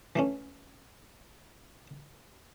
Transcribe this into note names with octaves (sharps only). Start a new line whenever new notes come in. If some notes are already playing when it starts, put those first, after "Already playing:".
E3 A3 C#4